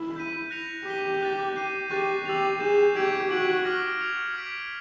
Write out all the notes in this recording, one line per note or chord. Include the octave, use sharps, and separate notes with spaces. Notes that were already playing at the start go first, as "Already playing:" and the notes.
Already playing: E4
G6 B6 D#7
F#6 A#6 C#7 F7
G4 D6 G6 B6 D#7 G7
D6 F#6 A6
G6 C7 D#7
G4 C#6 F#6 A6 C7
G4 E6 A6 C7 F7
G#4 G6 C7 E7
G4 E6 G#6 B6 D7
F#4 E6 G#6 B6 D7 F#7
D6 F6 A#6
G#6 C#7 F7
D6 F6 G#6 B6 D7